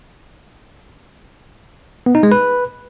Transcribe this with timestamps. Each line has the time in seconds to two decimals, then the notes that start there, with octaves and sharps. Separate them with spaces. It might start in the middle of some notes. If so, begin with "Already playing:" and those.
2.06 B3
2.15 D#4
2.23 G#3
2.32 B4